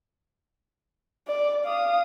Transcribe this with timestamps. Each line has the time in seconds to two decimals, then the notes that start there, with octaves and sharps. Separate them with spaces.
1.28 D5
1.65 F5 D#6